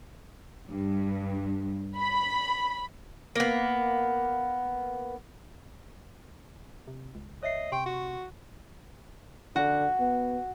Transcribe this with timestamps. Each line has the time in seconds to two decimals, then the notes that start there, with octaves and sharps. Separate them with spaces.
0.68 G2
1.98 B5
3.35 A#3 B3
6.87 C3
7.15 C#2
7.43 C#5 D#5 E5 C7
7.72 C3 G5 C6 C#6
7.86 F#4
9.56 D3 F#4
10.00 B3